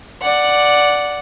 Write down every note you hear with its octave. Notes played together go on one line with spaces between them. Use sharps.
D5 F#5